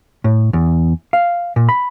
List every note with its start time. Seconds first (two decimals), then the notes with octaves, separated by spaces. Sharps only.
0.24 A2
0.53 E2
1.13 F5
1.56 A#2
1.69 B5